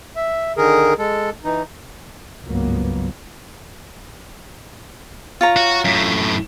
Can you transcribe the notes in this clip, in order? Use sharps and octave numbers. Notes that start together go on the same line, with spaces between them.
E5
D3 D#3 G#4 A#4
G#3 A4
E3 D#4
G#1 C#2 G2 F#3 A#3 B3
F4 C#5 A#5
F#4
F#2 A2